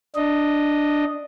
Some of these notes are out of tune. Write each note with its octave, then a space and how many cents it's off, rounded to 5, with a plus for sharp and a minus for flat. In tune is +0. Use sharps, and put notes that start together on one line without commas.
D4 +5 D#5 +0